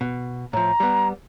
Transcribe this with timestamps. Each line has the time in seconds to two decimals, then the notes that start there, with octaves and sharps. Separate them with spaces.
0.01 B2
0.53 A2 F3 A#5
0.80 G3 B3